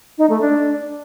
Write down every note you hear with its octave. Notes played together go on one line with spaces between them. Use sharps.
D#4
A3
D4